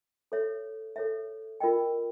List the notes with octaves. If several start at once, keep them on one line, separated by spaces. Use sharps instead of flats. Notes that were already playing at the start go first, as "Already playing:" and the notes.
A4 C#5 E5
A4 C#5 E5
F4 A#4 D#5 G5